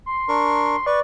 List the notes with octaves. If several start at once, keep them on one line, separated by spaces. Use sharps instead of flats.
C6
D4 A#4 C#6
B4 D5 C#6